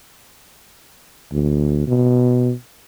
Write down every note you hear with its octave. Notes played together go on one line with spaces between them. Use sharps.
D2
B2